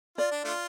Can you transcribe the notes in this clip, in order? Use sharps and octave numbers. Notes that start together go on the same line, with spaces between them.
F4 D5
D4
A3 D4 F4